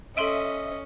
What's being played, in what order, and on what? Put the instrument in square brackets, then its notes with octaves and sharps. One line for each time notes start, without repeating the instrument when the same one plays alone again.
[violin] C#4 [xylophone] A4 C6 D7 [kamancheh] D#5 [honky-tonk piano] E5 D#7